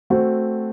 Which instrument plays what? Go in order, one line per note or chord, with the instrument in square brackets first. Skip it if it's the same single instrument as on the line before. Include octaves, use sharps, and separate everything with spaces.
[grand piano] A3 C4 F#4